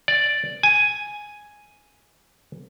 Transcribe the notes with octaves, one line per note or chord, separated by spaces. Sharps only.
D5
G#5